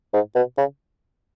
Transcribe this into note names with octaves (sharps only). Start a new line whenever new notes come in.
G#2
B2
C#3